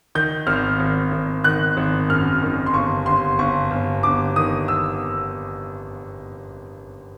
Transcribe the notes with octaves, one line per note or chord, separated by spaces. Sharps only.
D#3 G6
G#1 F6
G#1
G#1
D#3 F#6
G#1
F#2 F6
D#3
C6
G1 C#6
G1 C6
G1 C#6
G1
G1 D6
D#3 D#6
E6